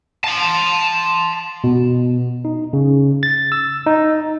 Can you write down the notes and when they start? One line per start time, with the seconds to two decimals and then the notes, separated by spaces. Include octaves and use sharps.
0.24 A5 C6
1.64 B2
2.45 D#4
2.73 C#3
3.23 A6
3.52 E6
3.86 D#4